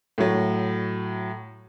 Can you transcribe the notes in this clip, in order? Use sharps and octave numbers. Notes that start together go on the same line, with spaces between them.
A2 F#3